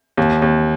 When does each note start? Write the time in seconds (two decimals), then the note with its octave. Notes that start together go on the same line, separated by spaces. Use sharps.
0.17 D#2
0.42 D#2